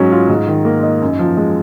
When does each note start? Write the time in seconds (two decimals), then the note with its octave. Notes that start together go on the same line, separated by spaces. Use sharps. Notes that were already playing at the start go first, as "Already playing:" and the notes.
Already playing: G#2 F#3 C#4
0.11 F4
0.29 G#2
0.47 D#3
0.65 A#3
0.83 D#4
1.02 F#2
1.19 F3
1.37 G#3